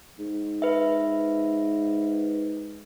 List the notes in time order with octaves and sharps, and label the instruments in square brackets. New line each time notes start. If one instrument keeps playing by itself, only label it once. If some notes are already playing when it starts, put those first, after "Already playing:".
[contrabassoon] G#2
[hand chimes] B4 E5